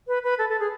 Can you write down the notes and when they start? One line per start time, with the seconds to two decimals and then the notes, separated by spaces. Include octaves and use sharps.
0.07 B4
0.23 B4
0.38 A4
0.49 A4
0.59 G#4